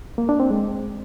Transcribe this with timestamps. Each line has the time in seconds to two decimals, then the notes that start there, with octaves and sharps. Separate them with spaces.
0.18 A#3
0.29 D4
0.40 C4
0.50 G#3